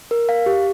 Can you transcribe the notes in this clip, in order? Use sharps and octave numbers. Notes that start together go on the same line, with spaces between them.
A#4
F5
G4